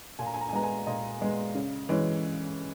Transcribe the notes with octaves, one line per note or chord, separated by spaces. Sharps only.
A#2 G#5
A#5
G#5
A#5
G#5
G#3 B3 A#5
G#5
A#2 D#5
G#3 B3
C#3
E3 G#3 C#4